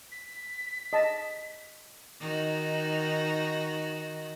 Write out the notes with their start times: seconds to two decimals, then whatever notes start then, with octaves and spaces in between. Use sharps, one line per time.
0.12 B6
0.93 D#5 A5
2.20 D#3 D#4 F#4